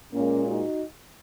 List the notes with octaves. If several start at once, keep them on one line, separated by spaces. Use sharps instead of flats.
A#2 G#3 A#3 C#4
D#4 F#4